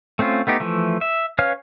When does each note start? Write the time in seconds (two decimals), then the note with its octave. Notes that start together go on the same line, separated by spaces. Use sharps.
0.19 A3 C4 C#4 F4
0.47 A3 B3 D#4 G4
0.60 E3 F3 A3
1.01 E5
1.39 C#4 B4 C#5 F5 F6